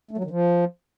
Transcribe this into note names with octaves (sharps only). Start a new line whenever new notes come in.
A3
F#3
D#3
F3